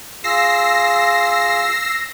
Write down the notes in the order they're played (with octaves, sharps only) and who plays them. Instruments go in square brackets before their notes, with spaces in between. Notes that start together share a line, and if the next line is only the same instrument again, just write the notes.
[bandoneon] F4 G#4 [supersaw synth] E6 A#6 C7